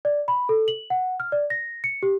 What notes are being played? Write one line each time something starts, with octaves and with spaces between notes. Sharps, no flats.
D5
B5
A4
F#7
F#5
F6
D5
A#6
C#7
G4